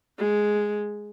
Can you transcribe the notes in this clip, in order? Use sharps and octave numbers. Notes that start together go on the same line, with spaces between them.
G#3